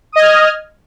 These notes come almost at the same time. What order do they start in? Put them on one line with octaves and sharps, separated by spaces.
D#6 D#5 G#6 F6